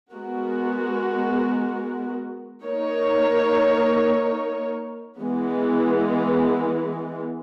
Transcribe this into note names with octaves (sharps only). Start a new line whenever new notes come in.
G#3 B3 F#4 A#4
A#3 D#4 A#4 C#5
E3 G#3 B3